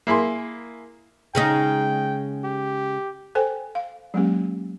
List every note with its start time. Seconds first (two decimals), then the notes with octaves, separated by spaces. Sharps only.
0.07 A#3 E4 G#4 C6
1.35 C#3 G#3 D#4 G5
2.44 G4
3.35 A4 C5 G5 G#5
3.75 F5
4.14 F#3 G#3 A#3 C#4 G4